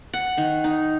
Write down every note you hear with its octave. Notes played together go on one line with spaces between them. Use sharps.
F#5
D#3
D#4